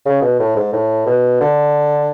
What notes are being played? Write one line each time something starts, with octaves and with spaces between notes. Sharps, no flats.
C#3
B2
A2
G#2
A2
B2
D3